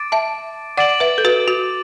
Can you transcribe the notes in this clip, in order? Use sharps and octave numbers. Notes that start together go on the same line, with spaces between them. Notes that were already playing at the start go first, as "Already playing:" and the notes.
Already playing: D6 A6 D7
E5 A5
D5 F#5 D6 A6 D7 F#7
B4 E5
A4
F#4 B4
F#4